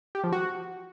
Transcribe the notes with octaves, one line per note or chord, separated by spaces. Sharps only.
G4
F3
F#4